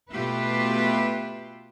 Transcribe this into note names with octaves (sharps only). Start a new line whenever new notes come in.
B2 A3 F4 G4 B4 E5